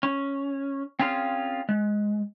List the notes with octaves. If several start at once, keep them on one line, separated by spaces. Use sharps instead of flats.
C#4
C4 C#4 F4 G#4 F5
G#3